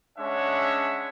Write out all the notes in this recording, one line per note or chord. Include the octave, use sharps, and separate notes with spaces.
G#3 C#4 D4 C#5 E5 F#5